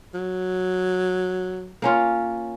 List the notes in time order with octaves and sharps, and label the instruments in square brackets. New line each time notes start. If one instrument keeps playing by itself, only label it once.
[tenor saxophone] F#3
[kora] A#3 C#4 F4